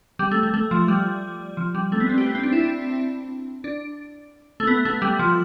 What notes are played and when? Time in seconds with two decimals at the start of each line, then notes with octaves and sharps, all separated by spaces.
0.19 G3
0.31 A3
0.43 A3
0.54 A3
0.71 F3
0.88 G3
1.57 F3
1.75 G3
1.92 A3
2.00 B3
2.09 C4
2.18 G4
2.26 B3
2.35 C4
2.43 D4
2.53 E4
2.60 D4
3.64 D4
4.60 A3
4.67 B3
4.85 A3
5.02 G3
5.19 F3